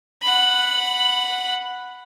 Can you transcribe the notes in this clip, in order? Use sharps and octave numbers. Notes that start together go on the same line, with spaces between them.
F#5 B5